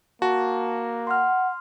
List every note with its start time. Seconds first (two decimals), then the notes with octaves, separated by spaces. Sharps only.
0.22 A#3 F#4 A5
1.07 F#5 C6 F6